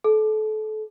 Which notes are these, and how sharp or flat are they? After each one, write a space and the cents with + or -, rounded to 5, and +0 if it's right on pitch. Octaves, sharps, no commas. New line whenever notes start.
A4 -30